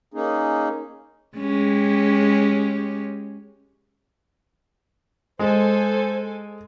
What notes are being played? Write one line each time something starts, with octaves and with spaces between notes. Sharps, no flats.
A#3 C#4 D#4 G#4
G#3 C#4 G4
G#3 A4 C5 G#5